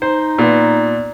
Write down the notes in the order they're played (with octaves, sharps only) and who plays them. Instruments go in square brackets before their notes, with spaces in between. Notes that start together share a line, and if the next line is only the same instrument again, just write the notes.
[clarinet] D#4 [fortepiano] C5
[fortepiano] A#2 B3